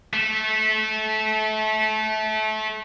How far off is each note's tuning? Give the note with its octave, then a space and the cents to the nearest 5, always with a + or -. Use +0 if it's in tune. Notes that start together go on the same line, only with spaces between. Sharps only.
A3 -25